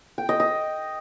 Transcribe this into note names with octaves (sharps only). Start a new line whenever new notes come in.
G5
D#5
D#5